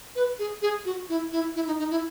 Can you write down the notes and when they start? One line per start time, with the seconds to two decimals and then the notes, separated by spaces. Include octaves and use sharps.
0.16 B4
0.39 G#4
0.62 G#4
0.85 F#4
1.09 E4
1.32 E4
1.56 E4
1.67 D#4
1.79 D#4
1.91 E4